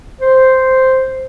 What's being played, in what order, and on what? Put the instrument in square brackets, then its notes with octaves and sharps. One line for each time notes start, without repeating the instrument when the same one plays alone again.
[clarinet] C5